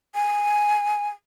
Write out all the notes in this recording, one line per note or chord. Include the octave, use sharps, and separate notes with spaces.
G#5